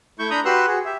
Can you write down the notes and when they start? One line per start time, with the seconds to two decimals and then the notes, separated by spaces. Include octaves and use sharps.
0.19 A3 E4 C#6 G6
0.30 D4 A#5 B5 D#6 G6
0.45 F#4 G4 B4 C6 E6 F#6
0.67 F#4 G#4
0.85 G4 E5